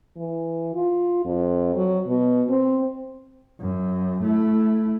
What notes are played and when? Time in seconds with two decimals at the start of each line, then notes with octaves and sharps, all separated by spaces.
0.17 E3
0.74 F4
1.25 F2
1.75 F#3
2.07 B2
2.49 C4
3.60 F#2
4.23 A3 E4